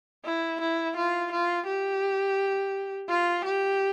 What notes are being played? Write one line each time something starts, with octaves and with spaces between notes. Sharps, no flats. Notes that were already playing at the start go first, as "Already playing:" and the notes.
E4
E4
F4
F4
G4
F4
G4